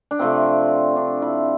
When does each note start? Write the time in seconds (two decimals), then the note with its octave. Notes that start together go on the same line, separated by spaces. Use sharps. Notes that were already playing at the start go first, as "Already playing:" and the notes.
0.11 D4
0.19 C3 F3 A3 C4
0.96 D4
1.22 E4